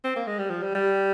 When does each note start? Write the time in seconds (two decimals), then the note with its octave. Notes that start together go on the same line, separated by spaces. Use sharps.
0.04 C4
0.16 A#3
0.27 G#3
0.39 G3
0.50 F3
0.62 G3
0.75 G3